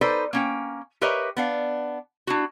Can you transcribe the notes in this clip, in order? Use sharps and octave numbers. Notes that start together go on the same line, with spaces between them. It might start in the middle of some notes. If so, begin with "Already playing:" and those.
D#4 A4 B4 C5 D5
A#3 C#4 G5
G4 A#4 B4 C#5 D#5 E5
B3 D4 F5
D4 E4 F#4